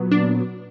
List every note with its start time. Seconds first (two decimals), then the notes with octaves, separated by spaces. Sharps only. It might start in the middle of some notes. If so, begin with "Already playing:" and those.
Already playing: A#2 F#3 B3
0.11 D4